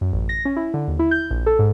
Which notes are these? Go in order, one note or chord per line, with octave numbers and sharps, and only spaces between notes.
F#2
A1
A#6
C#4
E4
D3
D#2
E4
G6
A#1
A4
G#2